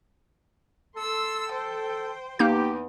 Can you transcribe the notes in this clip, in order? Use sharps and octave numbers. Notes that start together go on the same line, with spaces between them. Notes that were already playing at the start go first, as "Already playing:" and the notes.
A4 C6 E6
C5 G5
E2 A#3 D#4 G4 G6